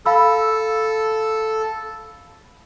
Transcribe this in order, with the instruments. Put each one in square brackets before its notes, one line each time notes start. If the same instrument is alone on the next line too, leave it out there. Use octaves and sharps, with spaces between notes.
[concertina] A4 [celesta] F5 B5 E6